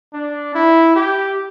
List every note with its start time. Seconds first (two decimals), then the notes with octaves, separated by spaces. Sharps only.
0.14 D4
0.55 E4
0.96 G4